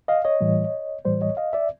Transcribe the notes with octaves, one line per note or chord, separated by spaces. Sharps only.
D#5 F5
C#5 D#5
A2 E3 G3
A2 E3 G3 C5 D5
C#5 D#5
D#5 F5
D5 E5